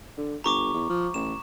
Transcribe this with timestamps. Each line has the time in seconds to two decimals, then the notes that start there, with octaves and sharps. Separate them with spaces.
0.17 D3
0.44 G1 A#5 C#6 D6
0.74 E2
0.89 F3
1.14 A1 E7